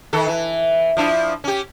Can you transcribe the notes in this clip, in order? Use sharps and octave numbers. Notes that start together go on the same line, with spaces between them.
D#3 A4
E3
F3 D4 E4
C#4 G4